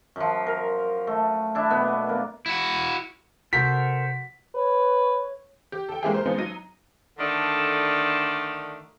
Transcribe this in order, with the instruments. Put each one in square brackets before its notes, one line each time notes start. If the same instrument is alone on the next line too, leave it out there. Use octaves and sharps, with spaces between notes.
[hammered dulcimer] F#2 F3
A#4
A3
D4 E4
B2 B3
A#3
[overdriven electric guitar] E4 F#4
[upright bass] C3 F3 [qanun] F#4 [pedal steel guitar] A4 A#4 C5 [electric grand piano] B6
[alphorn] B4 [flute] C#5
[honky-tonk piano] G4
A4 G5
G#3 A#3 C#4 E4 G4 G#4
A#4 C5
F3 G#3 B3 C4 D#4
F#3 D#4 A#6 D#7
[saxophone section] D3 D#3 A3 D4